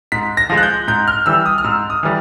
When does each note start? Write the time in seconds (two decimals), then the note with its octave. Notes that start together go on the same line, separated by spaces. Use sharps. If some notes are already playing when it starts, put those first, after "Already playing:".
0.12 G#2 B6
0.37 A#6
0.50 F3 G#3
0.57 F#6
0.63 G6
0.88 G#2 G6
1.08 F6
1.26 E3 G3 E6
1.46 D#6
1.58 F6
1.64 G#2 E6
1.90 D#6
2.03 E3 G3